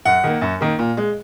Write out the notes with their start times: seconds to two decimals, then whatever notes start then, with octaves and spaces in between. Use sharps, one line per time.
0.05 F#2 F#5
0.24 D#3 A#3
0.41 F#2
0.61 D#3 A#3
0.79 A#2
0.97 G#3